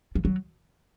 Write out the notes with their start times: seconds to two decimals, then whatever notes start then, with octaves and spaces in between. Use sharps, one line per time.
0.15 F3
0.25 F#3